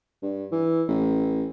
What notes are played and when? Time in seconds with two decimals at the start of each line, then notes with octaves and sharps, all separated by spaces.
0.22 G2
0.51 E3
0.88 A1